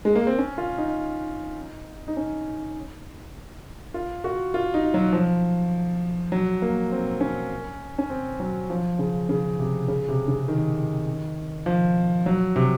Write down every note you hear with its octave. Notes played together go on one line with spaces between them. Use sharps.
G#3
A#3
C4
C#4
F4
D#4
D#4
C#4
F4
F#4
F4
D#4
F#3
F3
F#3
A#3
C4
C#4
C#4
C4
F#3
F3
C#3
C#3
C3
C#3
C3
C#3
D#3
F3
F#3
C3